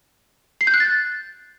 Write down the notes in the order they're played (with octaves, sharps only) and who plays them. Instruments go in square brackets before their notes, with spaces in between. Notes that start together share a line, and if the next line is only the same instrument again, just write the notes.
[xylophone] C7
G6
F#6
A6